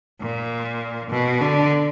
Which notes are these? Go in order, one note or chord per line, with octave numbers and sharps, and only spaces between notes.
A#2
B2
D3